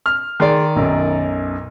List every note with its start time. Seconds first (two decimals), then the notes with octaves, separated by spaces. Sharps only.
0.06 F6
0.40 D#3 G#4 D5 C6
0.76 B1 F#2